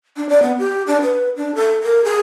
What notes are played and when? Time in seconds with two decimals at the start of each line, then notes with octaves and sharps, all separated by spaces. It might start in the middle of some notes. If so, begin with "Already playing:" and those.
0.17 D4
0.29 D5
0.42 B3
0.59 G4
0.87 D4
1.01 B4
1.36 D4
1.55 A4
1.83 A#4
2.04 G#4